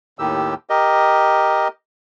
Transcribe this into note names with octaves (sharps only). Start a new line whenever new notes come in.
D#2 A2 D#3 G4 E6
G4 A#4 D#5